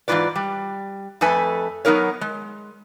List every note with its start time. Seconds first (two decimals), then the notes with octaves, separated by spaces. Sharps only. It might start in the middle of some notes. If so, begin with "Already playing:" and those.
0.08 G#2 E3 C4 F4 B4 D5
0.36 G3
1.21 F2 A3 A4 B4 G#5
1.85 F#3 B3 D#4 A#4 C#5
2.21 G#3